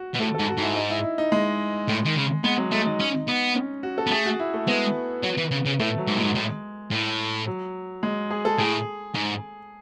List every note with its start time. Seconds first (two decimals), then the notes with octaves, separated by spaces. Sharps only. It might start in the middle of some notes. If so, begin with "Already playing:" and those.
Already playing: F#4
0.14 B2
0.20 A2 A4
0.35 G#2 A4
0.48 F#4
0.57 G#2 E4
0.76 D#4
0.90 E4
1.04 E4
1.18 D#4
1.32 G#3
1.88 A2
2.05 D#3
2.16 C#3
2.44 G#3 B3
2.58 F#3
2.71 G#3 A3
2.86 D#4
3.00 C#4
3.28 B3
3.56 C#4
3.83 F#4
3.98 A4
4.07 B3
4.11 A3 G#4
4.26 F#4
4.39 E4
4.54 A3
4.67 G#3 B3
5.23 F#3
5.37 E3
5.51 C#3
5.66 C#3
5.80 A2 A3
5.98 F#3
6.07 G#2
6.16 A2 G#3
6.24 G#2
6.35 A2
6.91 A2
7.47 F#3
8.03 G#3
8.31 G#4
8.45 A4
8.58 A2 G#4
9.14 G#2